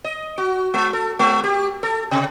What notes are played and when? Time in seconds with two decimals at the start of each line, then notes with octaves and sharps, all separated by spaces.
0.04 D#5
0.38 F#4
0.74 G#3
0.93 A4
1.19 G#3
1.44 G4
1.83 A4
2.11 C3